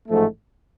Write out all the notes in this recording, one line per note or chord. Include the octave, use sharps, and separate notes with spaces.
A1 G#2 F3 A3